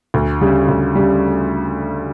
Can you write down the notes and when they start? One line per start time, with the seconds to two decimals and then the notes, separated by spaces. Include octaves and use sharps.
0.14 D2
0.41 C#3 G3
0.68 D2
0.96 C#3 G3